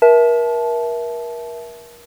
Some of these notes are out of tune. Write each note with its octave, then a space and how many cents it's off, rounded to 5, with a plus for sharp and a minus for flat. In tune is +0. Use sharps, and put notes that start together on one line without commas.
A#4 +35 E5 +0 A5 -20